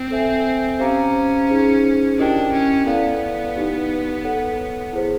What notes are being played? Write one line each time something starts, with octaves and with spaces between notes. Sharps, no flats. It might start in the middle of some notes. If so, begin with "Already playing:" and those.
Already playing: C4
A4 C5 E5 G#5
C#4 G4 C5 F5 A#5 D6
D#4 G#4 C5
D4 E4 G4 A#4 D#5 G5
C#4
B3 E4 A4 D5 F5
D#4 G4 B4
A4 C#5 F#5
E4 G#4 C5